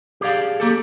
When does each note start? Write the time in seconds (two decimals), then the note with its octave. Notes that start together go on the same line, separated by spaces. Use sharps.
0.21 G4 G#4 D5 F5
0.60 A#3 G4 A4